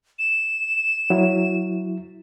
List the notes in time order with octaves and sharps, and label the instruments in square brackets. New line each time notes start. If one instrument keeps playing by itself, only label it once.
[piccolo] E7
[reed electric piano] F#3 E4